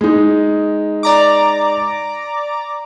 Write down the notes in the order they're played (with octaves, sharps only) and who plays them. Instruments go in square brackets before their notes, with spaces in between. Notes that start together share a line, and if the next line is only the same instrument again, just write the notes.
[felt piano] G#3 D#4
[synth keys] D5 A#5 D6